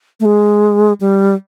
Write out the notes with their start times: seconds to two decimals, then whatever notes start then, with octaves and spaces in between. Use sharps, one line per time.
0.20 A3
0.25 G#3
1.01 G3